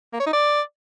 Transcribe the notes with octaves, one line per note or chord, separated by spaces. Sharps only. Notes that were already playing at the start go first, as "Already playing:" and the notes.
A#3
C#5
D#4
D5